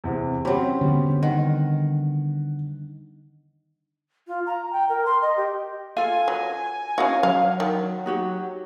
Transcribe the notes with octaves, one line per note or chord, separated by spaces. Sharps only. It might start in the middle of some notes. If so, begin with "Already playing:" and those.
E2 C3
F#3 C4 C#4 G4 B5
D3 G3 B3
D#3 F#5
F4
A#5
G5
A#4
C6
D#5
G4
F4 A4 F5 G#5
F#3
C#4 D#4 E4 F#4 F5
F#3 C#5 F5
D#3
D#4 F#4 G4